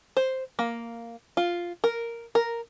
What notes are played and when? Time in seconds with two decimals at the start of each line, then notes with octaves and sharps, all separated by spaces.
0.17 C5
0.59 A#3
1.37 F4
1.84 A#4
2.35 A#4